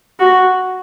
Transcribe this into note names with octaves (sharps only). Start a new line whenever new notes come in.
F#4